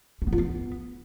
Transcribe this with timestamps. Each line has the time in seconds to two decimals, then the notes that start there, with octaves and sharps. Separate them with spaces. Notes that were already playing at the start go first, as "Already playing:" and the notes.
0.22 C#4
0.27 B3
0.33 F4
0.38 B3